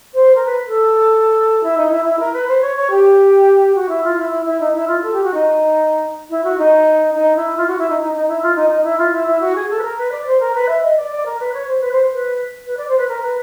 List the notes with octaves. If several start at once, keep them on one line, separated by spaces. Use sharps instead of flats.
C5
A#4
B4
A4
E4
D#4
E4
E4
A#4
B4
C5
C#5
C#5
G4
F#4
E4
F4
E4
E4
E4
D#4
E4
F4
A4
G4
F#4
D#4
E4
F#4
D#4
D#4
E4
F4
F#4
E4
D#4
D#4
D#4
E4
F4
D#4
D#4
E4
F4
E4
E4
F#4
G#4
A4
B4
A#4
B4
D5
C5
A#4
B4
E5
D#5
D5
D5
A#4
B4
C#5
C5
B4
C5
B4
B4
D5
C5
B4
A#4
B4